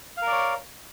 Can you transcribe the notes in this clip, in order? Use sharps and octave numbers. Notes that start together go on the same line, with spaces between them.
A#4 C#5 D5 F5